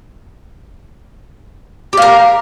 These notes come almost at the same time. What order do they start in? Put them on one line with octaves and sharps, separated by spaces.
G4 F5 A#4